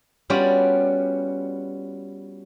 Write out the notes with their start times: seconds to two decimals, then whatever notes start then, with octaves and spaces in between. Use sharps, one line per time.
0.30 G3 B3 C#4 F4 F#4 D5